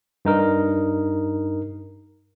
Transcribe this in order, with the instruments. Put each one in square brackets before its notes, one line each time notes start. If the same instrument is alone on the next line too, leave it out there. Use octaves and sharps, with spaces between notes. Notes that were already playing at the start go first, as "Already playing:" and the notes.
[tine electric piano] G2 D#4 A#4